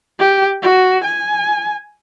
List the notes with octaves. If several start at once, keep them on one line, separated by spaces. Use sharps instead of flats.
G4
F#4
G#5